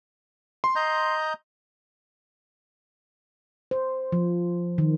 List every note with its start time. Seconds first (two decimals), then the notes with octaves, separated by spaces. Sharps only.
0.64 C6
0.76 D#5 A#5 G6
3.71 C5
4.12 F3
4.78 D#3